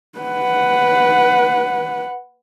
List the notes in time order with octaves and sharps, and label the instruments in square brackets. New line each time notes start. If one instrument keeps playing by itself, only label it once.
[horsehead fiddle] B4 F#5